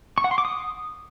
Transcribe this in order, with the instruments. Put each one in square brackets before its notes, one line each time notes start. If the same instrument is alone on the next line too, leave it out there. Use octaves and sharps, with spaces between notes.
[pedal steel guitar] C#6
F#5
C6
D6
D#6